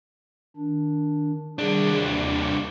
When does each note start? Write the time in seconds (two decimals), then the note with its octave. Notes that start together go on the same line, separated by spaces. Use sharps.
0.56 D#3 D4
1.59 C2 D#3 G3 D4 G#4
2.00 D#2 D6